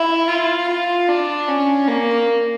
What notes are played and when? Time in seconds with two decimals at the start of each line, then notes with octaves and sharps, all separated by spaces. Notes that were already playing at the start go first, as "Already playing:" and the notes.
Already playing: E4
0.28 F4
0.68 F4
1.09 D4
1.48 C#4
1.88 A#3